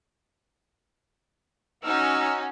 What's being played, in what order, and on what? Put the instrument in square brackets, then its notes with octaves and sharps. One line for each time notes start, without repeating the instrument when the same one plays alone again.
[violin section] C#4 D#4 F#4 [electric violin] E6 F6